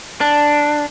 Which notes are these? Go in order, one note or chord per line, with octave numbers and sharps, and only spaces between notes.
D4